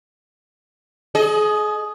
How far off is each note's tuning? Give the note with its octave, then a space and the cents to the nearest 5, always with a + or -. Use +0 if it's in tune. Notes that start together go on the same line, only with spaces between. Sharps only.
G#4 +35 D#5 +0